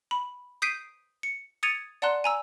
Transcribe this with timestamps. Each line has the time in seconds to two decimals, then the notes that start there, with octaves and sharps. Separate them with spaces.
0.11 B5
0.62 D#6 G6 B6 C7 D7 D#7
1.23 C#7
1.63 D#6 G#6 A6 C#7 D#7 F7
2.02 D5 F#5 A5 A#5 C6 F#6
2.24 G#5 A#5 E6